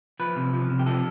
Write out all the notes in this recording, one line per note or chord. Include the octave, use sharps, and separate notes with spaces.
F3 B4
C3
F3
C3
G4
F3 A4